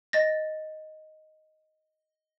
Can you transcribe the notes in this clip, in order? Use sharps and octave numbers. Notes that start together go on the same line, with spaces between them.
D#5 A6 A#6